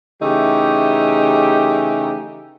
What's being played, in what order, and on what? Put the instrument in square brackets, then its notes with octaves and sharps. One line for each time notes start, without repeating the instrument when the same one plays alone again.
[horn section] C#3 E3 A3 D#4 G4